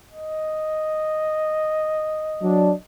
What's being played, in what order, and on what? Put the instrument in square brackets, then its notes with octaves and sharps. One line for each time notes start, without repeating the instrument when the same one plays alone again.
[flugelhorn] D#5
[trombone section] F#3 D4